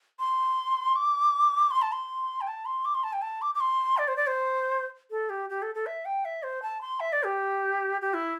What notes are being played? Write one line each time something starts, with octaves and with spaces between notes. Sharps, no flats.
C6
D6
C6
A5
C6
G5
A5
C6
D6
C6
A5
G5
A5
D6
D6
C6
D5
C5
D5
C5
A4
G4
G4
A4
A4
E5
G5
E5
C5
A5
C6
E5
D5
G4
G4
E4